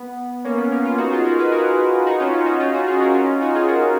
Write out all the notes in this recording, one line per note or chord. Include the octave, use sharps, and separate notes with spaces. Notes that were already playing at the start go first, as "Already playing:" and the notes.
Already playing: B3
A#3 C#4
B3
A#3 C#4
C#4 F4
D#4 F#4
F4 G#4
F#4 A#4
G#4 B4
F#4 A#4
D#4 F#4
C#4 F4
C#4 F4
D#4 F#4
C#4 F4
D#4 F#4
F4 G#4
F#4 A#4
C#4 F4
D#4 F#4
F4 G#4
F#4 A#4